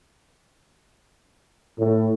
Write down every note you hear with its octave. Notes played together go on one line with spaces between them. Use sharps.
A2